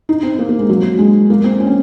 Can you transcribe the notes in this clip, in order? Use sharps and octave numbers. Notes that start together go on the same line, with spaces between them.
D#4
C4
A#3
A#3
G#3
F#3
G#3
A#3
C4
C#4
C4